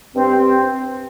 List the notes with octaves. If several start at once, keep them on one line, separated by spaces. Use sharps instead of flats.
G2 C4
C4